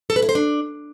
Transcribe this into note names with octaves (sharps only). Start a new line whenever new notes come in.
A4
B4
E4
C5
D4